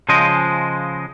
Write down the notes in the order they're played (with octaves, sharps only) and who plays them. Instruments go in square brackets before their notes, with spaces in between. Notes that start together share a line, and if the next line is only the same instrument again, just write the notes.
[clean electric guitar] C#3 F3 G#3 C5 D#5